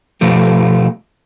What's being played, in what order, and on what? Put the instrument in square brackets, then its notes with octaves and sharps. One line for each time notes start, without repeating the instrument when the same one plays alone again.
[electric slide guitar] B2 F3 A3 G4